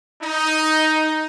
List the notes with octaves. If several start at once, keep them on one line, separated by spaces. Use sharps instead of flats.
D#4